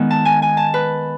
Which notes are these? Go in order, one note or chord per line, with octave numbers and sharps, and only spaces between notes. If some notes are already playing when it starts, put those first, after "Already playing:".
Already playing: D#3 G#3 B3 D#4
A5
G#5
G#5
A5
B4